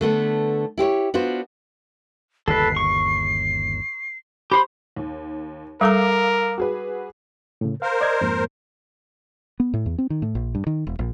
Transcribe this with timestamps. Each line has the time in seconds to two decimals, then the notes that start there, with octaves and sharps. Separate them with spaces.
0.01 D3 A3 B3 D4
0.78 E4 G4 C5 C#5
1.14 B3 D4 F4 F#4 C5
2.48 G1 D#2 C#3 A4 B4 C7
2.77 C#6
4.52 G4 C5 B5 C6
4.96 D#2
5.81 G3 A4 A#4 F5 A#5 D6 E6
6.58 F#4 G#4 B4
7.61 A2 C#3
7.82 A#4 C5 F5
8.01 D5 D#5 G#6
8.21 F2 G#2 A#3
9.60 B3
9.74 A2
9.86 E2
9.98 C4
10.10 D#3
10.22 A2
10.35 A#1
10.55 G2
10.67 D#3
10.87 E1
10.99 A#1